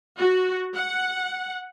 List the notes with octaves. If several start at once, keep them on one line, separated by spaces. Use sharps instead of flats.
F#4
F#5